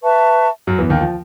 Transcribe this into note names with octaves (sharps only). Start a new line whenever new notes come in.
B4 E5 A5 C#6
F#2 F#3
E2 E3
D#2 D#3
F3